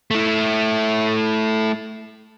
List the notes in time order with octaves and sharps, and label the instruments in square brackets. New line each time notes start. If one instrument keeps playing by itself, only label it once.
[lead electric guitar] A3 E4